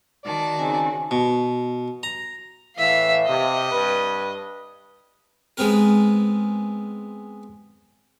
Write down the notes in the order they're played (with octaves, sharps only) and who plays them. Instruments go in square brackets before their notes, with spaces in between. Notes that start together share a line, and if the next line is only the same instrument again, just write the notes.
[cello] D#3 F#4 [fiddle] D5 A5
[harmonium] C#3 C4 D#4 [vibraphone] G#5
[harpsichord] B2
A#5
[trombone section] A2 E3 [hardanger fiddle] E5 F5
[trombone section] C3 [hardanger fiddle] D#5
[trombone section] G2 B4
[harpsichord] G#3 B3 C4 A#4